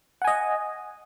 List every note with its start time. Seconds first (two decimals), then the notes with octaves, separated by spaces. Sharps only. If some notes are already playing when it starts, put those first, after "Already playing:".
0.22 F#5
0.25 G#5
0.28 D#5